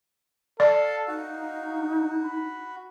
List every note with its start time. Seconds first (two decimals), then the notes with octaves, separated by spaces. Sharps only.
0.60 A4 D5 F5 A5
1.08 D#4 F#4 F5
2.25 B5